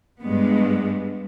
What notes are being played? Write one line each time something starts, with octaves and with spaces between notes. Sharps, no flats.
G2 G#3 B3